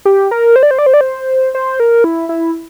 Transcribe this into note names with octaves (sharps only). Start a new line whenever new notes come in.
G4
A#4
C5
D5
C5
D5
C5
D5
C5
C5
A#4
E4
E4